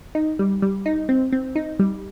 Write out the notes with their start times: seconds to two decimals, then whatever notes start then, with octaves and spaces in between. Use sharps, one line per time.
0.15 D#4
0.39 G3
0.62 G3
0.86 D#4
1.09 C4
1.33 C4
1.56 D#4
1.79 G3